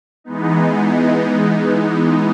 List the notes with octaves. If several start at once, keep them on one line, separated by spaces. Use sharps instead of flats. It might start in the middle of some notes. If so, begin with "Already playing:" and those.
E3 G#3 B3 D#4